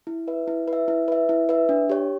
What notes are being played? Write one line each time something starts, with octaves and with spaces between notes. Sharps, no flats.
E4
B4 E5
E4
B4
E5
E4
B4 E5
E4
B4 E5
D4
G4 C#5